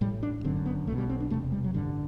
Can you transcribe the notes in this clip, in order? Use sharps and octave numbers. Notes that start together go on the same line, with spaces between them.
A1 A2 G3
D4
G1 F#2 D3 C4
B3
B1 A3
B2
G3
C4
D4
E1 E2 C3 A3
G3
F#3
A1 G2 D3 G3